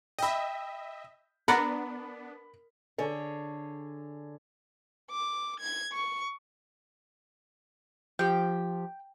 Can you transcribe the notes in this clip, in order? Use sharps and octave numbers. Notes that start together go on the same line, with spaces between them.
D#5 E5 G5 B5
B3 D4 A#4 D5 F#5 B5
D3 G#4 C#5
D6
G#6
C#6
F3 G4 G5